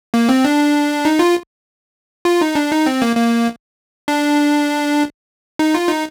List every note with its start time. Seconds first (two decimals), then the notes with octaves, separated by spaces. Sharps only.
0.14 A#3
0.29 C4
0.45 D4
1.05 D#4
1.19 F4
2.25 F4
2.41 D#4
2.55 D4
2.71 D#4
2.86 C4
3.02 A#3
3.16 A#3
4.08 D4
5.59 D#4
5.74 F4
5.88 D#4